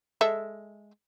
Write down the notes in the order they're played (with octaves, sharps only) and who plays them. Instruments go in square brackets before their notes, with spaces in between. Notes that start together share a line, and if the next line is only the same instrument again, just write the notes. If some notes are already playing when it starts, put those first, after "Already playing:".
[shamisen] G#3 A4 E5